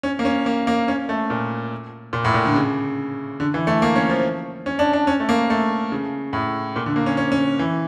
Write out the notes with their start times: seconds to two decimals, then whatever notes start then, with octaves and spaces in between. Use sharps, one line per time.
0.03 C#4
0.19 A#3
0.25 C#4
0.46 A#3
0.67 A#3
0.88 C#4
1.09 A3
1.30 A#2
2.13 A#2
2.25 A2
2.34 A#2
2.46 D3
2.55 C#3
3.40 D3
3.54 E3
3.67 A3
3.82 A#3
3.95 C#4
4.09 F3
4.66 C#4
4.79 D4
4.93 D4
5.07 C#4
5.20 A3
5.29 A#3
5.50 A3
5.92 C#3
6.33 A2
6.76 A#2
6.86 D3
6.96 A#3
7.06 C#4
7.17 C#4
7.32 C#4
7.59 E3